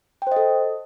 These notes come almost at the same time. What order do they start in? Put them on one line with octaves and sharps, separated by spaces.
G5 C5 D#5 A4